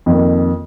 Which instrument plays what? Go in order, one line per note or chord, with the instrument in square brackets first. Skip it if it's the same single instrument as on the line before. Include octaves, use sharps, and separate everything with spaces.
[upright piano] F2 D#3 A#3